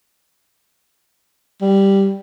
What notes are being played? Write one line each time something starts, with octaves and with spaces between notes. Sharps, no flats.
G3